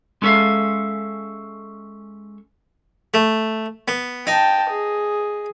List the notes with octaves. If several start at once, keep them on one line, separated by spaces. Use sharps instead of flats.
G#3 C#4 A4 C#5 E5 F5
A3
B3
D#4 G5 A5
G#4